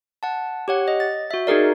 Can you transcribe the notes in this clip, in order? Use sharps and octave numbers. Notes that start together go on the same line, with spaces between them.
F#5 A5
G4 C#5 F#5
D#5
A6
F#4 E5
D#4 F#4 G#4 A#4 D5